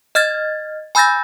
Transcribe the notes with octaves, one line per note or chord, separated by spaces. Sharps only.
D#5 F6 G#6 A6
G#5 B5 E6 G6 A6 A#6